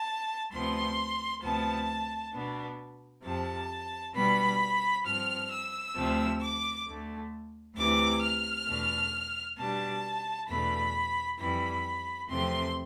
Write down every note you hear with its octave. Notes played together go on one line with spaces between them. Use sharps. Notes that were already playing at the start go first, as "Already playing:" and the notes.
Already playing: A5
D2 C3 F3 B3 C6
D2 C3 F3 B3 A5
B2 B3 D4
F2 C3 F3 A5
B2 G3 B3 D4 B5
G2 F3 C4 F6
E6
D2 C3 F3 A3
D6
D2 D3 A3
D2 C3 E3 D6
F6
E2 B2 A3 D4
B2 G3 D4 A5
E2 B2 A3 D4 B5
F2 E3 G3 B5
E2 C3 F3 A3 C4 C6